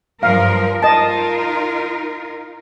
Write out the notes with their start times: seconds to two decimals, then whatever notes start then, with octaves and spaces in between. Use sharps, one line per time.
0.23 G2 F3 A#4 F5
0.82 D#4 F4 A#4 D#5 A5